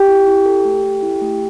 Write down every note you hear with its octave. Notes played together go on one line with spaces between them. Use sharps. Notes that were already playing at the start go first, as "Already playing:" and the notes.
Already playing: G4 G5
E4
E4
A4
A3
A4
E4
A3